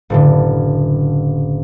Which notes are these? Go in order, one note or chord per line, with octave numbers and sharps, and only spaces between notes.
F#1 A2 D3